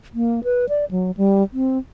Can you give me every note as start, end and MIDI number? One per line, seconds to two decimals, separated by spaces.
0.14 0.43 58
0.44 0.66 71
0.69 0.85 74
0.91 1.11 54
1.17 1.43 55
1.53 1.78 60